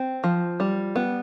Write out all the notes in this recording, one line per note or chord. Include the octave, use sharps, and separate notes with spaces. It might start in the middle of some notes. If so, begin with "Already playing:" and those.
Already playing: C4
F3
G3
B3